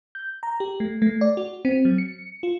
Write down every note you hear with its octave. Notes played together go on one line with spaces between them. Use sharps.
G6
A#5
G4
A3
A3
D5
F#4
C4
F#3
C#7
F4